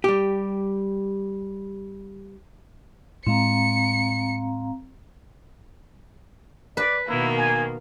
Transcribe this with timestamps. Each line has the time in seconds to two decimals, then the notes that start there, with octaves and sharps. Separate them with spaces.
0.04 G3 G4
3.26 A2 G#3 C4 F5 A#5 C#7
6.77 B4 D5
7.07 B2 D#3 A#3 E4
7.38 G#5